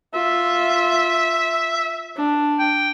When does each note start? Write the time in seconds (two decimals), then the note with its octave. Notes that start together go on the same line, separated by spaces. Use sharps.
0.14 F4 E5
2.17 D4
2.59 G5